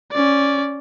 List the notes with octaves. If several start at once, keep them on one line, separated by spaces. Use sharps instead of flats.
C#4 D5